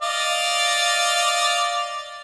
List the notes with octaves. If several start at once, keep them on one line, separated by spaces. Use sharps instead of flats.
D5 D#5 F5